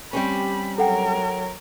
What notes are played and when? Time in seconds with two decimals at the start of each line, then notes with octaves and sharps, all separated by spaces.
0.13 G3 C4 C#4 G4 B5
0.78 F#3 A4 A#4 F#5 G5